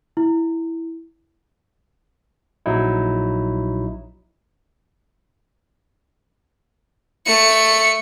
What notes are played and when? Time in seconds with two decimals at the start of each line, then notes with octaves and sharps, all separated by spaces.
0.17 E4
2.66 A#1 F#3 D#4 E4
7.27 A3 C#7